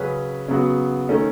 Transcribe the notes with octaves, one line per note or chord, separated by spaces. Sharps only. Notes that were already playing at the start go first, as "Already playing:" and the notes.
Already playing: C#3 F#3 C#4 G#4 B4
C#3 F#3 B3 F#4
D#3 A3 C#4